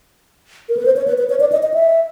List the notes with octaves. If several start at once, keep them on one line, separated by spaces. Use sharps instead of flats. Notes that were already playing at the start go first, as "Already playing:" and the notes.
A#4
B4
C5
C#5
B4
B4
C#5
D5
D#5
D#5
E5